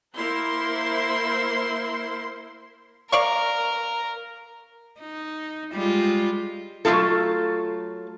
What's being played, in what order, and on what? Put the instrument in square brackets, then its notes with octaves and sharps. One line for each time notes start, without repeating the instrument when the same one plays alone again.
[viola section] A#3 E4 A#4 C5 C6
[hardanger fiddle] A#4 [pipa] D5 F5 C#6
[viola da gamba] D#4
G3 G#3 F4
[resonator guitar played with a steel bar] F#3 A3 C4 D#4 F4 A4